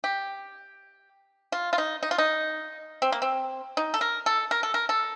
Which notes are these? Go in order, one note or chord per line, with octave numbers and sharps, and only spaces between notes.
G4
F4
F4
D#4
D#4
F4
D#4
C4
A#3
C4
D#4
A4
A#4
A4
A#4
A4
A#4
A4